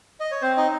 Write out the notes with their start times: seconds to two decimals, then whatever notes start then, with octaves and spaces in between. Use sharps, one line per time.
0.20 D#5
0.31 C#5
0.42 C4 C5
0.57 D#4 D#5